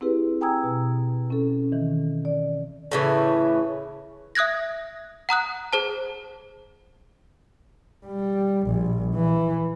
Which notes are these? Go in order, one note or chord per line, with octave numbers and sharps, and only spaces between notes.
C4 E4 G4 G#4 B4
G5 G#5 A#5 D#6 E6 G#6
B2
C#4 A4
D#3 E3
D5
A2 C#3 E3
E5 D#6 F#6 G#6 A#6
F#5 A#5 D#6 F#6
G#4 C5 A5
G3
A#1
E3